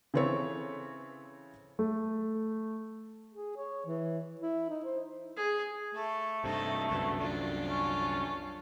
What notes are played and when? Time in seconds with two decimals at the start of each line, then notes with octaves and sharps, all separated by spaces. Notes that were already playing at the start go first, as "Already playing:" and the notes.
0.14 C#3 E3 C4 A4 C#5
1.79 A3
3.35 G#4
3.57 C#5
3.86 E3
4.41 E4
4.69 D#4
4.85 C5
5.37 G#4
5.95 A3 A4
6.44 G2 C3 D#4 A4
6.90 C2 F#2 D3 B3 A4
7.21 D4 F4
7.68 C#4